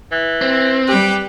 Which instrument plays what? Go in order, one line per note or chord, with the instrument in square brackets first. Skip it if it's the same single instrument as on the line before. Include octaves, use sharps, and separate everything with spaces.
[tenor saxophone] E3
[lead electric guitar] C4
[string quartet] G3 G4 [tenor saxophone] B4